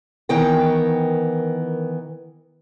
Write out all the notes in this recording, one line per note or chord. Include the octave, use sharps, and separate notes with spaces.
D#3 E3 B3 A#4 G5